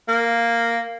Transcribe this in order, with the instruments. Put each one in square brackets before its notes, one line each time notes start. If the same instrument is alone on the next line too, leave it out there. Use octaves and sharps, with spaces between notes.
[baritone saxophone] A#3